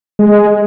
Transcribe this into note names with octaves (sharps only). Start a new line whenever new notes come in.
G#3